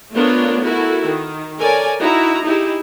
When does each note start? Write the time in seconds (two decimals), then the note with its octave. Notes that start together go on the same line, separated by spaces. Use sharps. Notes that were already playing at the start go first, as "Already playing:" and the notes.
0.14 A3 B3 D4 F4 A#4 C#5
0.64 E4 F#4 A4 A#4
1.03 D#3
1.59 A4 A#4 C#5 D5 G#5
2.00 D#4 E4 F#4 A#5
2.44 D#4 E4 G4 G#4